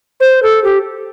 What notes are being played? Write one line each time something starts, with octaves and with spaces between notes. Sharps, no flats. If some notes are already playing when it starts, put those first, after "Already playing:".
C5
A4
G4